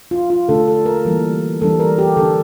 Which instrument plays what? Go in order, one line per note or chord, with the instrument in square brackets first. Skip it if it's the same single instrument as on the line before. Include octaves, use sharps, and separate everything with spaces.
[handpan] F4
F4
D3 A3 D4 A4
A4
A#4
E3 G3 A#3
E3 G3 D4 A4
A#4
G4
D3 G3 D4 A4